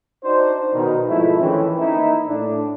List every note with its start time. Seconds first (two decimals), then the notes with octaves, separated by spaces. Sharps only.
0.23 D4 D#4 F#4 C5
0.73 B2 D#3 D#4
1.08 G#2 F3 G#3 A3 E4
1.39 D#3 E3 G#3 A3 C4 C#4
1.79 A#3 D#4 E4
2.27 A2 D4